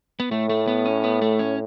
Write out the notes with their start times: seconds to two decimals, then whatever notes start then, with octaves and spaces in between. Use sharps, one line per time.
0.20 B3
0.31 A2 A3
0.50 A3
0.68 B3
0.85 C#4
1.04 B3
1.22 A3
1.39 C#4